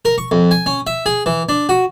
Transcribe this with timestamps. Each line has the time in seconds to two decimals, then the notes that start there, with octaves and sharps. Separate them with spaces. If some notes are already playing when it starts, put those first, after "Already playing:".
0.05 A#4
0.18 C#6
0.31 F2
0.51 G#5
0.66 C#4
0.87 E5
1.06 G#4
1.26 E3
1.49 D4
1.69 F#4